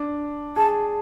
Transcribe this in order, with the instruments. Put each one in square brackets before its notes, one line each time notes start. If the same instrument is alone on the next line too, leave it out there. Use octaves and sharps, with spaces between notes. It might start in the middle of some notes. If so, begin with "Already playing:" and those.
Already playing: [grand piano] D4
[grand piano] G#4 [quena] A5